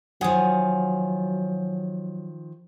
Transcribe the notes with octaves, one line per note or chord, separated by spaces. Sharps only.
D#3 F3 F#3 F#5 G#5 D#6